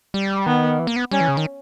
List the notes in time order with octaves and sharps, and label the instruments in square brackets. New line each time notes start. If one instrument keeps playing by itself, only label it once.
[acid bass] G3
[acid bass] D#3 [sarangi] B3
[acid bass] E3
A#3
B3
[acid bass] G3 [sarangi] C#4
[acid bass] E3
C#3
D#3